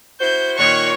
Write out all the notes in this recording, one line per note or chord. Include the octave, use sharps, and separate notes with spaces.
E4 F#4 C5 G6
A#2 D#3 C#5 C#6 F#6